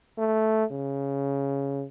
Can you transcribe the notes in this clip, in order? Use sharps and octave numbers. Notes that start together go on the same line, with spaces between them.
A3
C#3